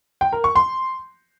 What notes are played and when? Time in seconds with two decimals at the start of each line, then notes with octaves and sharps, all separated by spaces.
0.21 G5
0.33 A#4
0.44 C#6
0.56 C6